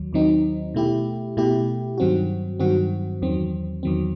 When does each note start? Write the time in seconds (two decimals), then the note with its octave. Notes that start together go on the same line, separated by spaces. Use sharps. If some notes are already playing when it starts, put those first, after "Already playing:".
Already playing: D#2 D#3 F#3
0.13 D#2 D#3 F#3 C4 D#4
0.75 B2 A3 E4 G4
1.37 B2 A3 E4 G4
1.98 G2 D#3 F#3 C4 F#4
2.60 G2 D#3 F#3 C4 F#4
3.22 E2 D#3 F#3 C4
3.83 E2 D#3 F#3 C4